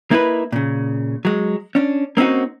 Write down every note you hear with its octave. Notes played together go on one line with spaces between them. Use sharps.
A#3 D#4 E4 A#4 B4
A#2 C#3
F#3 G#3
C#4 D4
A#3 C4 C#4 D#4 F#4